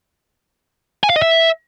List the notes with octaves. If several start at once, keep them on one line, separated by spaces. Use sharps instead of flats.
G#5
F5
D#5
E5